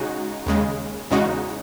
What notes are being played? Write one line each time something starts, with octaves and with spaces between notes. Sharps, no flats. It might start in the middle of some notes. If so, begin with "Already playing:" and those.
Already playing: C#3 G#3 D#4 F#4
D#2 C#3 G#3
E2 C#3 G#3 D#4 F#4